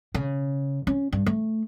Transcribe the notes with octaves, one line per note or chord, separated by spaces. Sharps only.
C#3
C#4
G2
A3